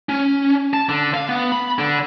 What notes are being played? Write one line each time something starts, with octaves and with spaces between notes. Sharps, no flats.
C#4
A5
D3
F5
B3
B5
D3